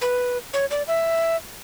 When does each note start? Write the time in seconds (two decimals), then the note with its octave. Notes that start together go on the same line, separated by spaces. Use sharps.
0.01 B4
0.54 C#5
0.71 D5
0.88 E5